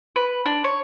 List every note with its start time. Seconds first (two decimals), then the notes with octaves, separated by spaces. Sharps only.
0.16 B4
0.46 D4
0.64 C#5